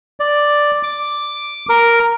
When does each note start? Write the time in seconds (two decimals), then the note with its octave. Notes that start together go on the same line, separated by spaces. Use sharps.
0.20 D5
0.83 D6
1.69 A#4